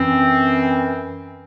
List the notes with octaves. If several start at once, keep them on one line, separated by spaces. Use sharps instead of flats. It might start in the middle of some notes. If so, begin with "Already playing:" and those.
Already playing: F#2 E3 C4